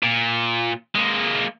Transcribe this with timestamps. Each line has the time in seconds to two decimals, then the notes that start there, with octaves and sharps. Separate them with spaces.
0.03 A#2
0.95 G#3 A#3